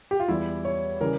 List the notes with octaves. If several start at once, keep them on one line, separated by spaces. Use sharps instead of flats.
G4
F4
E2 E3 G3 E4
C#5
C#3 E3 G3 A#4